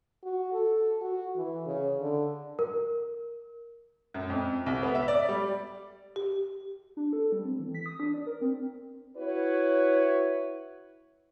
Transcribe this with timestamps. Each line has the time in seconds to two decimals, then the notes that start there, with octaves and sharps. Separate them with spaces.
0.23 F#4
0.53 A4
1.01 F#4
1.35 E3
1.66 C#3
2.00 D3
2.59 A#4
4.14 F#2
4.30 F2
4.66 C2
4.83 B3
4.95 E5
5.08 D5
5.29 G3
6.16 G4
6.97 D4
7.13 A4
7.32 G3
7.45 C4
7.60 E3
7.75 B6
7.86 D#6
8.00 D4
8.14 D5
8.27 A#4
8.41 C4
9.15 E4 F#4 B4 C#5